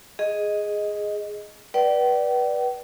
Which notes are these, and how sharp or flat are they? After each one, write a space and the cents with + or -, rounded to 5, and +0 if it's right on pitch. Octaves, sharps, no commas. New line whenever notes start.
G#4 +0 D#5 +0
B4 -20 D5 +0 G5 -45